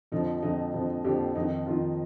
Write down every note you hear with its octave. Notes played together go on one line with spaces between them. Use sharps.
F2 D3 F3 D#4
F2 D3 F3 D#4
F2 D3 F3
F2 D3 F3 G4
F2 D#3 D#4
F2 D#3 F4